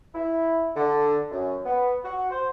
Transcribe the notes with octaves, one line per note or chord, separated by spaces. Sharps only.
E4
D3
F#2
B3
F#4
C5